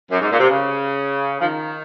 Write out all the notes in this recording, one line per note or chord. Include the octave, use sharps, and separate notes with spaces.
F#2
G#2
A#2
C3
C#3
F3
D#3